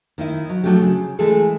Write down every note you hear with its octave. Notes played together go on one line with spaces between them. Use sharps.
D#3 D#4 E4
F#3
F3 F#3 A3 D4 G4
C#3
E3 G#3 A3 G#4 A4